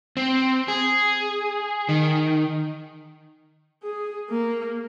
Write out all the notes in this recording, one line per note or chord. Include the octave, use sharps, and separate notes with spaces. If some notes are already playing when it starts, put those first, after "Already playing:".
C4
G#4
D#3
G#4
A#3